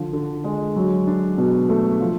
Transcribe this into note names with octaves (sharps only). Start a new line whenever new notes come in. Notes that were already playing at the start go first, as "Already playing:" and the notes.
Already playing: D3 F3
D3
G#3
F#3
D4
B2
A3
F3